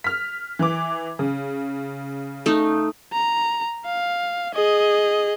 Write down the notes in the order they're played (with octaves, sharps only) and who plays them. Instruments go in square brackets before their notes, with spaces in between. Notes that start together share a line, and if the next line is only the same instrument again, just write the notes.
[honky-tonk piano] F6 B6
E3 D6
C#3
[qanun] A3 D#4
[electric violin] A#5
F5
G#4 D#5